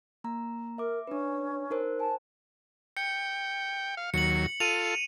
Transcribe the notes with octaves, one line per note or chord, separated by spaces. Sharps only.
A#3 A#5
A#4 E5 D6
C#4 D4 B4
D#4 A#4 C5
C5 G#5 A5
G5 C#7
F5
D#2 F#3 C#7 F#7
F4 A4 D#7 F7